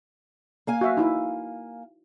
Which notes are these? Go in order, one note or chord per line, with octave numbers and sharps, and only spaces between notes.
A#3 F5 G#5
F#4 E5
D#4 E4